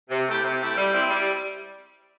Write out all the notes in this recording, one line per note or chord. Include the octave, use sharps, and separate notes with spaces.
C3
A3 E4 G4
C3
A3 E4 G4
G3
C4 E4
G3